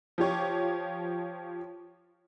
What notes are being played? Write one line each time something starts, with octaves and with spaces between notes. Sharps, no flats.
F3 G4 C#5